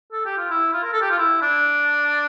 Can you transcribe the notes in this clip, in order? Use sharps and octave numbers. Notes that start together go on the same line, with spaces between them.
A4
G4
F4
E4
F4
A#4
A4
G4
F4
E4
D4